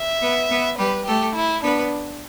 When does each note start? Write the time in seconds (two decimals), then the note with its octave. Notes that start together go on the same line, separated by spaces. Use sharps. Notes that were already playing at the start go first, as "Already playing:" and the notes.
Already playing: E5
0.21 B3 B4
0.51 B3 B4
0.78 G3 G4 B4
1.06 A3 G4 A4
1.35 E4
1.63 B3 D4 B4